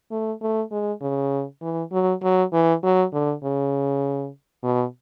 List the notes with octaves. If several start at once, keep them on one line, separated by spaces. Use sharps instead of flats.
A3
A3
G#3
C#3
E3
F#3
F#3
E3
F#3
D3
C#3
B2